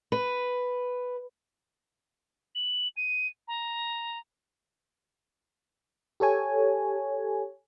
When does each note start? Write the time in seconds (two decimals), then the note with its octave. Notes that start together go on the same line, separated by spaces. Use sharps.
0.12 B4
2.55 F#7
2.97 D#7
3.48 A#5
6.20 G4 A4 C#5 G#5